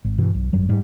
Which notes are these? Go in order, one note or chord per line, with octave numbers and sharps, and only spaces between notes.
G#1
G2 B2 E3
B1
G#1 F#2 F#3 G3
G#2 G3